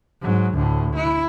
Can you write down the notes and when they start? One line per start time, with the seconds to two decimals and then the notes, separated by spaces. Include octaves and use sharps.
0.22 G#2 F#3
0.54 D2 A2
0.96 E4